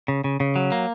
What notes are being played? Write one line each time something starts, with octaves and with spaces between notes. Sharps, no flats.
C#3
C#3
C#3
F#3
A#3